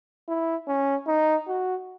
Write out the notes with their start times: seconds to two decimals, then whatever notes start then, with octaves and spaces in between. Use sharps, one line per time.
0.28 E4
0.68 C#4
1.08 D#4
1.48 F#4